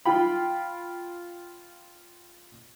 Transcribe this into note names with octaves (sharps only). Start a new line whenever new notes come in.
F4 G5 B5